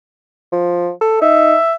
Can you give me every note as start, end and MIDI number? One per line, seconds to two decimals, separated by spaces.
0.52 0.91 53
1.01 1.19 69
1.22 1.56 63
1.22 1.74 76